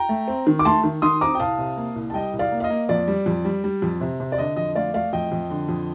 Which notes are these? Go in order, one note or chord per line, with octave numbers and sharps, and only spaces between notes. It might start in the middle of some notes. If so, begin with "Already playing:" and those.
Already playing: G5 A#5
A3
C4
D#3
D6
A3 A5 C6
D#3
D#3 C6 D#6
C4 A#5 D6
G5
C2 F5 A5
C3
A#3
C2
A5
G3 D#5 G5
C2
D5 F5
A#3
F5
D#5
A#3
F2 D5
G3
F2
G3
G3
F2
C3
C3
D5
D3 D#5
F2 D#5
A3 D5 F5
A3 D5 F5
F2 D#5 G5
F2
D3
F2